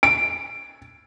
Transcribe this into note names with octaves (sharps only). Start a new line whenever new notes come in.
D7